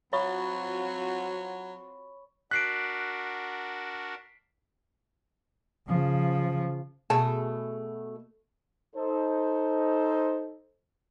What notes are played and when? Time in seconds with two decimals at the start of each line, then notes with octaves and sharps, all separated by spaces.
0.13 F#3 C4 F4 F#4 C#5 B5 C#6
2.51 D4 F#4 A#4 F#6 B6 C7 D7
5.87 C#3 F3
7.10 B2 A3 G#4 A5
8.96 D#4 A4 C5